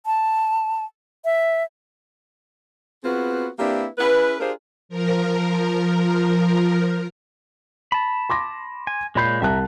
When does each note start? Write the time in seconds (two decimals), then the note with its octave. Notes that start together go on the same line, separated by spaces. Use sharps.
0.06 A5
1.25 E5
3.04 B3 C4 F4 F#4 G#4 B4
3.58 A#3 C4 D4 E4 G4 B4
3.98 C#4 E4 G#4 B4
4.39 D4 F4 G4 G#4 A#4 C5
4.89 F3 A#4
7.92 A5 B5
8.30 C6 D6 A#6
8.87 G#5
9.15 A#2 G#3 C#5 B5 G6 C7
9.42 C2 E5 A5 A#5 F#6